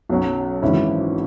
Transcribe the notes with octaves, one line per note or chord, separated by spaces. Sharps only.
B1 B2 F#3 C#4
G#1 G#2 E3 C#4 E4